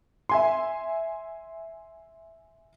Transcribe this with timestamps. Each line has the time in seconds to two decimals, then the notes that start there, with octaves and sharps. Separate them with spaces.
0.29 E5 G#5 C6